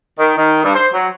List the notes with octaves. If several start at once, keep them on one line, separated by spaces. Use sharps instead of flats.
D#3
D#3
G2
C5
F#3